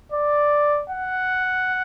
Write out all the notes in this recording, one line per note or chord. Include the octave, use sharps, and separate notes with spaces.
D5
F#5